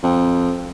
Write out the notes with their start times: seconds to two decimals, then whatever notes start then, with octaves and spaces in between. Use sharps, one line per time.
0.03 F2